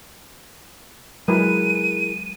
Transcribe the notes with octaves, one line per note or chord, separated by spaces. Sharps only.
F#3 G#3 E4 G#4 A#4 B4 D#7